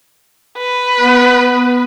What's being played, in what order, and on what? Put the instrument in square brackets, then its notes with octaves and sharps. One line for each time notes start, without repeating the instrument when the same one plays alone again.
[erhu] B4
[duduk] B3